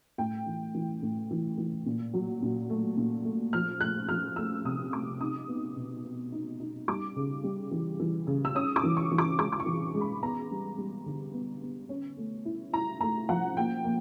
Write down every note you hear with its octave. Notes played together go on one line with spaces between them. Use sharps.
A2 G5
E3
E3
A2
E3
E3
A#2
F#3
A#2
A3
A#2
A3
F3 F6
A3 F#6
F3 F6
A3 E6
C3 D#6
A3 D6
D#4 D#6
B3
B2
B3
D#4
D#4
G3 D6
C#3
G3
E3
E3
C#3
E6
C#4 D#6
D6
E3
C#6
E3
D6
G#3 D6
D6
C#6
E3
G#3
B5
B3 A#5
G3
G3
D3
B3
B3
C#4
A3
E4
E4 A#5
A3 A#5
F3 F#5
A#3 G5
A#3